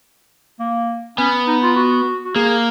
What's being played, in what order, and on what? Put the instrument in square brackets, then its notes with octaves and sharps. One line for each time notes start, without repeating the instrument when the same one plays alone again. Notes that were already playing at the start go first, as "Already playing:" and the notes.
[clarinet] A#3
[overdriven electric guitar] B3 [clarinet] C#4
[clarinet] D#4
F4
F#4
F#4
[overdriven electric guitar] A#3 [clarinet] G#4